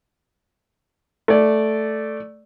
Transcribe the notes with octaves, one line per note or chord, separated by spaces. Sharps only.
A3 D5